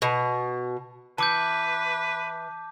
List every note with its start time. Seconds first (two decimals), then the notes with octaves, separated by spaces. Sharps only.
0.02 B2
1.18 E3 B4 A5 D6 G6